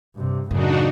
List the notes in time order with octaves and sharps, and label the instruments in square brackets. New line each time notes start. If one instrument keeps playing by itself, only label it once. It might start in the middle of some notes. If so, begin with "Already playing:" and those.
[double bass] G2 C3
[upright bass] F#2 E3 [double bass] A2 C#3 [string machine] D4 D#4 F#4